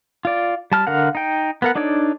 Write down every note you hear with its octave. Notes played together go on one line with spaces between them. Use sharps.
F4 D5
G3 A5 F6
D3 A#4 F5 F#5
D#4 G5
B3 A#4 F#5
D4 D#4 A4 C#5 D5